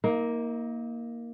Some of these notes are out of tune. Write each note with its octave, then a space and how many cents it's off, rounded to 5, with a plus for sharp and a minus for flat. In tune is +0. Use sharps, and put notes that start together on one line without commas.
A#3 +5 D#4 +40